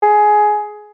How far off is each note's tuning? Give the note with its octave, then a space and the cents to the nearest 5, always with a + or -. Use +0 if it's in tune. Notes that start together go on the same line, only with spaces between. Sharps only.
G#4 +15